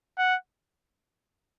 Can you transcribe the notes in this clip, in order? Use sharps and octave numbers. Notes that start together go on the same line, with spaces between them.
F#5